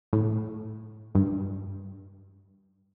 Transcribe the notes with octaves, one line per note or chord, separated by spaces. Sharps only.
A2
G2